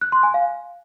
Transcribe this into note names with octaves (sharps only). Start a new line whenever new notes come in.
F#6
C6
G#5
F5